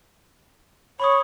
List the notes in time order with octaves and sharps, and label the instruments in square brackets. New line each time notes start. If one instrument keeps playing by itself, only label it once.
[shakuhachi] C#5 [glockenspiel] B5 C#6 D#6